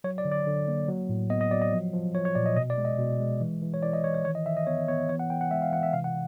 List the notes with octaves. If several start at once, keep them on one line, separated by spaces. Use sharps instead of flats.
F#3 C#5
D5
D3
D5
D3
A#3
F#3
A2
B3 D#5
D#5
F#3 D5
D#5
F3
F3
F3 C#5
C#5
A#2 D5
D#5
B2 D#5
D5
G#3
D#5
B2
G#3
E3
E3
C#5
E3 D5
D#5
E3 C#5
C#5
D#3 C#5
D#5
D#3 E5
D#5
B3 C#5
B3 C#5
E3 C#5
F#5
E3 G5
F#5
G#3 E5
F5
E3 F#5
E5
C3 F5
F#5